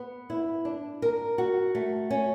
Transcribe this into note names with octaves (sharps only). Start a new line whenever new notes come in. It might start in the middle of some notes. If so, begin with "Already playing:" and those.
Already playing: B3
E4
D4
A#4
F#4
A3
C#4